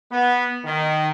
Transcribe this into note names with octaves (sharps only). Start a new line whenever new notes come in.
B3
D#3